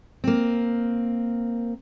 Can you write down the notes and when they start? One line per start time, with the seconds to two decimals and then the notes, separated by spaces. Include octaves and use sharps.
0.24 A#3 C4